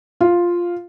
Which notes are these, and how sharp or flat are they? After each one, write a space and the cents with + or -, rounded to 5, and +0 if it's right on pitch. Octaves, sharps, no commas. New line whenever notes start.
F4 +0 F5 +0